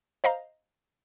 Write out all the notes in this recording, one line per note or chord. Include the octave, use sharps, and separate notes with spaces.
C5 D#5 F5 A#5